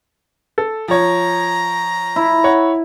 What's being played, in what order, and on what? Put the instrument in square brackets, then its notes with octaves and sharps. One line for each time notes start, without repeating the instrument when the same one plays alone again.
[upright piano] A4
[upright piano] F3 C#5 [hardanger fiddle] A#5
[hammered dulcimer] E4
[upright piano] C#5 F#5